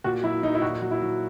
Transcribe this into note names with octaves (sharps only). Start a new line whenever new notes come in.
A#2 F#4
F#3 E4
F#3 D#4
E4
A#2 F#4
F#3
E4
F#3